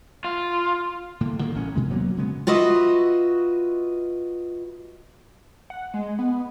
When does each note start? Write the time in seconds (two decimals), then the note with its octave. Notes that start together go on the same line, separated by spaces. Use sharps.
0.24 F4
1.21 A2 D3 A#3
1.41 D3 D#3 A#3
1.54 A1 C#4
1.75 B2 D#3 G#3
1.90 D1 F#3 A#3 B3
2.17 C#3 G#3 B3
2.47 F4 F#4 B4 D#5 E5
5.70 F#5
5.94 G#3
6.19 B3